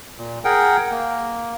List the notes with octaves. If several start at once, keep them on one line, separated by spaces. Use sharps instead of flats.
A#2
G#4 A#4 F#5 G5
A#3